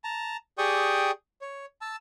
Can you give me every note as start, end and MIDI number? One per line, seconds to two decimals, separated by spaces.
0.04 0.37 81
0.04 0.37 82
0.58 1.11 67
0.58 1.11 68
0.58 1.11 74
0.58 1.11 79
0.58 1.11 85
0.58 1.11 87
1.41 1.66 73
1.81 1.96 81
1.81 1.96 88